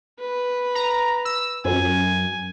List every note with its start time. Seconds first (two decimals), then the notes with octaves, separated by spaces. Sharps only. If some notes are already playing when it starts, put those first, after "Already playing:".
0.19 B4
0.75 A#5
1.25 E6
1.65 F#2 G#5